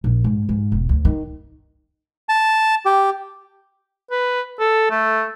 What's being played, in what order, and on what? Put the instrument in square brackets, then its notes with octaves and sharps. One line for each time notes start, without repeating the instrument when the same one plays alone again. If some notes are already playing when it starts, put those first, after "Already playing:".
[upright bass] A#1
G#2
G#2
E1
D2
D#3
[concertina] A5
G4
[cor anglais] B4
A4
A3